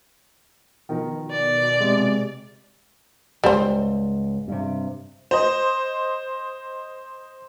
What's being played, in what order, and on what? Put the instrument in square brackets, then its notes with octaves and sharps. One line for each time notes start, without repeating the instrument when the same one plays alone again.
[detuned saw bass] B2 [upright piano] D#3 F3 A#4
[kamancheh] D5
[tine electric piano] C3 G#3
[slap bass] C#2 G#2 C#3 [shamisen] G3 C5
[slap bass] G2 C3
[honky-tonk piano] C5 D#5